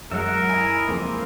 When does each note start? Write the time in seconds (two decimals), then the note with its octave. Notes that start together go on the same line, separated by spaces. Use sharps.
0.11 F#2 F#3 G#3 A#4 E5 F#5
0.49 E4 D#5 G#5
0.89 F2 G#3 A#3 C4 F4